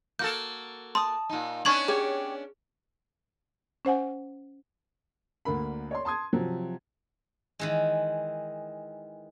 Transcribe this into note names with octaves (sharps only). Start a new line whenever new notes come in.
A#3 F#4 A4 G6
A5 C6 D#6
A#2 D#4
B3 C#4 D4 C#6 G#6 F#7
G4 G#4 C#5
C#4 C5 F#5 G#5
D2 D3 A#3 B5
C#5 D5 C6
A5 C6 D#6 G#6
C3 F3 F#3
D#3 E3 G#3